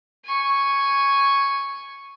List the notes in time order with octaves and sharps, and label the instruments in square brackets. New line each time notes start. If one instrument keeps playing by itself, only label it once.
[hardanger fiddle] G#5 C#6